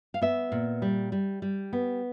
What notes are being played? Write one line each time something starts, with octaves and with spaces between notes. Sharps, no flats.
F5
B3 E5
A#2
G3
G3
G3
B3